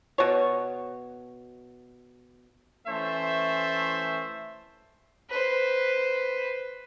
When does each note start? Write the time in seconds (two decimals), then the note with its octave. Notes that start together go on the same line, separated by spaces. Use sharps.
0.18 B2 C#5
2.87 E3 A3 C#4 C5 E5
5.30 B4 C5